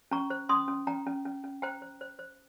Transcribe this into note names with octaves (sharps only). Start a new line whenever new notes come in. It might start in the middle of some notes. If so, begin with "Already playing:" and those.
C#4 A#5 C#6
C5
C#4 C6 D#6
C#4
C#4 G5 A#5
C#4
C#4
C#4
C5 G5 A#5
C5
C5
C5